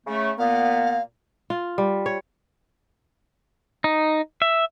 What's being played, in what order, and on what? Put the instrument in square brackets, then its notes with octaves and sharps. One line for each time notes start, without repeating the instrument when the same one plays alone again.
[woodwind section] C#3 A3
[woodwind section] A#2 A#3 B3 [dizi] F5
[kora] F4
G3
C#5
[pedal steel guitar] D#4
E5